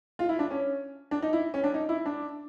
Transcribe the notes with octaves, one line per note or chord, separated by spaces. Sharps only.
F4
E4
D4
C#4
D4
D#4
E4
C#4
D4
D#4
E4
D4